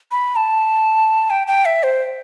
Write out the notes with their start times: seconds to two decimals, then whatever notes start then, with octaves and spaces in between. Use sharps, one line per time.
0.11 B5
0.36 A5
1.30 G5
1.47 G5
1.65 E5
1.83 C5